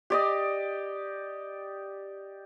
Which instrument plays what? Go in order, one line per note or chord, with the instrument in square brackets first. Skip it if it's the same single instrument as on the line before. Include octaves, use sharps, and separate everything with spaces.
[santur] G4 D5 D#5